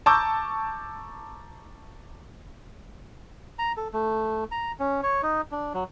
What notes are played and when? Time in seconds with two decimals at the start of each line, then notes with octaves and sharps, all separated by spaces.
0.06 A5 A#5 C#6 D6 E6 G6
3.59 A#5
3.77 A4
3.93 A3
4.51 A#5
4.79 C#4
5.03 C#5
5.23 D#4
5.51 D4
5.74 F#3